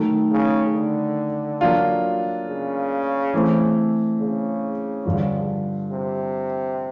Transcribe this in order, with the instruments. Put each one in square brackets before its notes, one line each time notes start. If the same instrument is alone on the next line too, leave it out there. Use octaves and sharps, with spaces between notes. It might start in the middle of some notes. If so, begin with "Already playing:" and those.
Already playing: [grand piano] D#3 F#3 A3
[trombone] C#3
D3
[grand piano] F#3 A#3 D4 F4
[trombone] C#3
[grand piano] E3 A3 C4
[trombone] C#3
[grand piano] G2 D3 F3
[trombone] C3